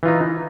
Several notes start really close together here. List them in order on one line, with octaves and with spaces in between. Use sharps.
E3 F4 D#4